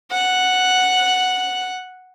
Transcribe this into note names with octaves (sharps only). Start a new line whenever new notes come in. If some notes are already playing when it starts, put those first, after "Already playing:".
F#5 F#6